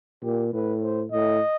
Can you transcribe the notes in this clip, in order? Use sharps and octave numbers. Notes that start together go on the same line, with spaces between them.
A#2 G4
A2 B4
C5
A2 D#5